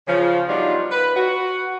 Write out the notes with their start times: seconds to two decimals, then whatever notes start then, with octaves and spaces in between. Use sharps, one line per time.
0.07 C#3 F3
0.47 F#3 G3 B3 D4 D#4 F4
0.91 B4
1.16 F#4